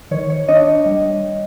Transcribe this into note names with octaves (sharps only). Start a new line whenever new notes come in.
D#3 C#5
C#5
D4 C#5 D#5
G3